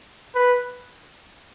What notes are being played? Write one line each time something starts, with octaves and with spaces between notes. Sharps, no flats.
B4